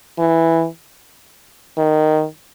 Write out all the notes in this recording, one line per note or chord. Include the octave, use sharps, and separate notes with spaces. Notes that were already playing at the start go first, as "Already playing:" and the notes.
E3
D#3